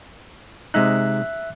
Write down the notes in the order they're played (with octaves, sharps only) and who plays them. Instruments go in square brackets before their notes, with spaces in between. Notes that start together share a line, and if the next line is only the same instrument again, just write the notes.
[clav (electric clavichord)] C3 G#3 D#4 [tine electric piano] E5 F#6